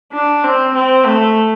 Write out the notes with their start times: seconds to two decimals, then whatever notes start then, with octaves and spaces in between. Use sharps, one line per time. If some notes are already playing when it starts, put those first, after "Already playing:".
0.13 D4
0.43 C4
0.75 C4
1.06 A3